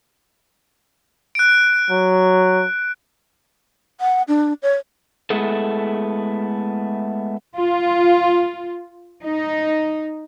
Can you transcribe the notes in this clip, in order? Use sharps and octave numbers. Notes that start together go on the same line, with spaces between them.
F#6 D7
F#3
F#5
D4
C#5
G#3 A3 B3 E4 G#4 A4
F4
D#4